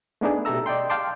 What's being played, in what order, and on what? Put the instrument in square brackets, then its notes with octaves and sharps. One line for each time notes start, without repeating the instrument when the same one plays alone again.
[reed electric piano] A3 B3 D4 D#4 G#4
B2 G4 A4 E5 A#5 E6
D5 D#5 G5 C6
F5 G5 A5 C6 D6